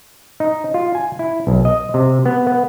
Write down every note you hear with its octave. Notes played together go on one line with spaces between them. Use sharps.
D#4
F4
G#5
E4
B1
D#5
C3
B3
B3